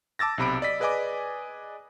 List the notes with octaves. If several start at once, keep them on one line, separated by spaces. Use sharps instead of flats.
A5 D6 E6 A6 A#6
B1 C3 B5 D7
D5 D#5 B6
G#4 B4 D5 D#5 G#5 D6